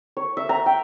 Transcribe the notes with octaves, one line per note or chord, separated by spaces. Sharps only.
C#5
E5
A#5
G5